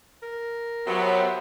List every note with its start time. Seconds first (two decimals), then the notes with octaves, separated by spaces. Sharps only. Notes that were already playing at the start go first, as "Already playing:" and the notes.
0.23 A#4
0.87 F#3 B3 G4 C5 E5